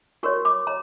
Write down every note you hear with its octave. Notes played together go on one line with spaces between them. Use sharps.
F#4 A#4 C#5 C#6
D6
C#5 A#5